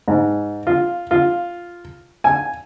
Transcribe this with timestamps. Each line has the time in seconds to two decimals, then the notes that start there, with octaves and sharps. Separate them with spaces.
0.08 G#2
0.67 F4
1.11 F4
2.24 G#5